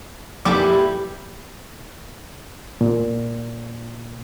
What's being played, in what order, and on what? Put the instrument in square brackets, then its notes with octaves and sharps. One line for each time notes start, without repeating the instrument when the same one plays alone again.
[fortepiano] F2 A#2 D6 [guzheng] G3 E4 B4
[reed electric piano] A#2